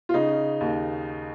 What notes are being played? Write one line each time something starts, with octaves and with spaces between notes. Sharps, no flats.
F4
C#3 D#4
D#2